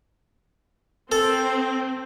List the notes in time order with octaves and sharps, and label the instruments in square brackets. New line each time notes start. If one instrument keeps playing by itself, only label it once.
[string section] C4 [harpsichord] A4